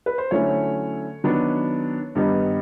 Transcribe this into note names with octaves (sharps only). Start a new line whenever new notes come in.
B4
C5
D3 F#3 A3 C#4 E4 C#5
D#3 F#3 B3 D4
G2 D#3 G3 B3 D#4